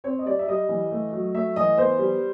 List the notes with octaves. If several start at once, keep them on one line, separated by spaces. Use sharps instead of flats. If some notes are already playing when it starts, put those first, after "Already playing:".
C4 C#5
D#5
G3 D5
E5
G3 D#5
E3
A3
F#3
A3 E5
E3 D#5
B3 C5
G3